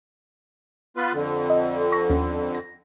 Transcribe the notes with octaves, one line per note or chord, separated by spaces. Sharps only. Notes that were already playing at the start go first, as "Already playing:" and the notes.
B3 F4 B4
F2 D3
D#5
C#6 A#6
D#2 C#4
A#6